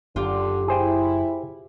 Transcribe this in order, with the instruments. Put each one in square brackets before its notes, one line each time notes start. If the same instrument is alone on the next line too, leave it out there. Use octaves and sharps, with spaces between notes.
[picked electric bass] F#1 F#2 [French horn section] D3 [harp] F4 G4
[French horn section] E4 [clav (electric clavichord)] G#4 C5 G5